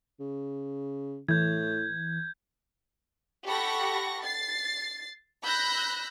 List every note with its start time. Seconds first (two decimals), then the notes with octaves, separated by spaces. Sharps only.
0.20 C#3
1.29 A2 E3 G6 G#6
3.45 G4 A4 F#5 B5 C#6 A#6
4.23 A6 C7
5.43 B5 E6 F#6 G6 A#6